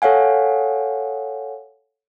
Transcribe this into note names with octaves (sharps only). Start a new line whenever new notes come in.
A4 C#5 F5 F#5 G#5